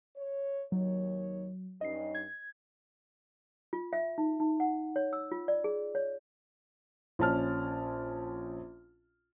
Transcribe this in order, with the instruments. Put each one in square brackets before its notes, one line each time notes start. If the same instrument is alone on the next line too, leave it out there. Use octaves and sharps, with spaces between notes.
[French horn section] C#5
[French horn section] D#2 D#4 C#5 [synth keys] F#3
[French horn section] G2 C#4 D#4 [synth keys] D#5 C7
[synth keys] G#6
[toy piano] F4
E5
D#4
D#4
F#5
C#5
E6
F4
D5
G#4
C#5
[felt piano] A#1 C#4 A5 F6